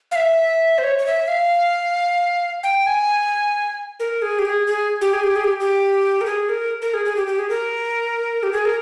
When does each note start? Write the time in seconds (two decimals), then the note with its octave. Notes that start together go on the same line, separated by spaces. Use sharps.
0.11 F5
0.16 E5
0.78 C5
0.84 C#5
0.98 C#5
1.06 E5
1.28 F5
2.63 G5
2.87 G#5
4.00 A#4
4.22 G#4
4.39 G4
4.45 G#4
4.67 G#4
5.01 G4
5.13 G#4
5.24 G4
5.36 G#4
5.44 G4
5.60 G4
6.21 A#4
6.26 G#4
6.49 A#4
6.82 A#4
6.94 G#4
7.05 G#4
7.16 G4
7.27 G4
7.39 G#4
7.50 A#4
8.43 G4
8.52 G#4
8.65 A#4